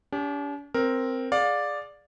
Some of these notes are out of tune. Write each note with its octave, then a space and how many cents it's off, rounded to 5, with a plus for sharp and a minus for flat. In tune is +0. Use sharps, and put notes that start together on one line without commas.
D4 -45 G4 +15
C4 +0 A#4 +0
G#4 +0 D5 +0 F5 +25